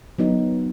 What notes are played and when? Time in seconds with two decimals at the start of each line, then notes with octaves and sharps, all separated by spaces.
0.18 F#3 B3 D#4